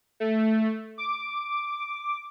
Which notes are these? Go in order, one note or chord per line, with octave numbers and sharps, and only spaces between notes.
A3
D6